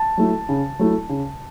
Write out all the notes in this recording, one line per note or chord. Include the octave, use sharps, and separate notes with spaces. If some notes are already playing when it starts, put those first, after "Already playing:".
Already playing: A5
F#3 A3 E4
C#3
F#3 A3 E4
C#3